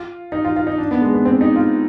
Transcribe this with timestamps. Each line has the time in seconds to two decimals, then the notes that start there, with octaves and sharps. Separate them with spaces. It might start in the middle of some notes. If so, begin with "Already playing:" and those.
Already playing: F4
0.32 D#4
0.45 F4
0.56 F4
0.67 D#4
0.78 D4
0.91 B3
1.01 G#3
1.14 B3
1.25 C4
1.41 D#4
1.56 F4